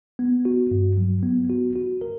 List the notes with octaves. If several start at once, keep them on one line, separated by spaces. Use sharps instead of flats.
B3
F#4
G2
F#3
B3
F#4
F#4
A#4